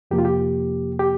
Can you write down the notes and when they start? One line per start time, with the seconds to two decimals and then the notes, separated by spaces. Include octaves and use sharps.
0.11 F2 C3 F3 A#3 G4
0.18 F4
0.25 G4
0.99 G4